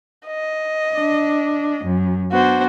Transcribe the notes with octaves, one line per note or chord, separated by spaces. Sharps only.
D#5
D4
F#2
B3 D4 F#4 C5